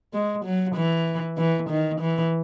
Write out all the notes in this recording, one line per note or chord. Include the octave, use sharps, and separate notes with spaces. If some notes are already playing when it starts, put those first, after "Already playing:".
G#3
F#3
E3
E3
D#3
E3